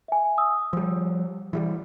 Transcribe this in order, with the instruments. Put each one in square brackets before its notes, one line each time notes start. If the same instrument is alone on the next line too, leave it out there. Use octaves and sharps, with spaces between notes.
[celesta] E5 G#5
D#6 E6
[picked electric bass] F3 G3
E3 F#3 G3